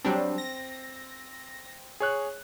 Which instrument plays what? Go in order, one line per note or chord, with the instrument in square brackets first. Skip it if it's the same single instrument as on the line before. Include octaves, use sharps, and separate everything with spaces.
[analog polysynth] F#3 G3 D4 [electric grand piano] C4
[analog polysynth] A#6
[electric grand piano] G#4 C#5 F#6